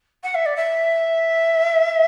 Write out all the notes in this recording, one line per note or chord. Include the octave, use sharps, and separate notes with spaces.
F#5
E5
D5
E5